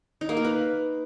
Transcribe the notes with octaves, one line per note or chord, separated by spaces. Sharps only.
D#4
A#3
A#4
B4